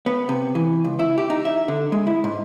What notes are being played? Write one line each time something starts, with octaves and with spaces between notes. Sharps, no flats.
B3
C3
E3
C#2
E4
G4
D#4
E5
D3
G#3
E4
G#2